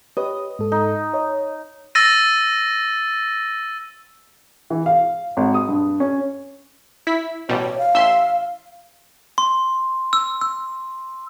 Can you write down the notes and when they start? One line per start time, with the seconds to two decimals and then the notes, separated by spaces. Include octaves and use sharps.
0.17 G4 B4 C#5 D#5
0.59 G#2 A4
0.72 D#4
1.14 C#5 D#5
1.95 E6 A6 A#6 D#7
4.70 E3
4.86 F5
5.37 G#1
5.54 D#6
5.69 G2
6.00 C#4
7.07 E4 B6
7.49 A1 B2 G3 C#5
7.78 F5
7.94 A1 E5 C6
9.38 C6
10.13 E6
10.41 E6